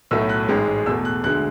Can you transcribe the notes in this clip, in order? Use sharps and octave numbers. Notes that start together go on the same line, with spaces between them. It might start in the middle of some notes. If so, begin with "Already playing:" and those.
B1 A2 F#3 A3 E6
F#6
A1 G#2 G#3
E2 B2 A3 E6
F#6
D2 D3 G#3 F#6